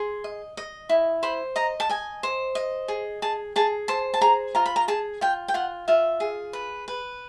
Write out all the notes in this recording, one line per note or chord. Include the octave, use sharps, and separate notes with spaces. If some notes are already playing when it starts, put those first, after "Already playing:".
Already playing: G#4 C6
D#5
D#5
E4
C5 B5
D#5 A#5
A5
D#5 G#5
C5
D#5
G#4
G#4 A5
G#4 A5
C5 A5
A5
G#4 A#5
F4 A#5
B5
A#5
G#4 A5
F4 G5
G5
F4 F#5
F4 E5
G#4
B4
B4